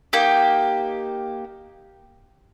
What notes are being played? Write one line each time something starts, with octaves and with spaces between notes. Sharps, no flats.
A#3 D#4 G4